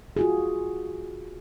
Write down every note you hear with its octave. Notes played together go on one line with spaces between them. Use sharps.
F4 F#4 G#4